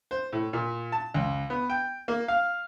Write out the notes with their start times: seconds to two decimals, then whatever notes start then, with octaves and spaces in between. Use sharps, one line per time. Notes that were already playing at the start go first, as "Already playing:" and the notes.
0.11 C5
0.33 A2
0.53 A#2
0.92 A5
1.14 C#2
1.50 B3
1.70 G5
2.08 A#3
2.28 F5